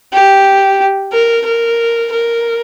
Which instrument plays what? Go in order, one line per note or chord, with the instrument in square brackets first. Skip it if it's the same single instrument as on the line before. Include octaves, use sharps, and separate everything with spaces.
[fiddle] G4
A#4
A#4
A#4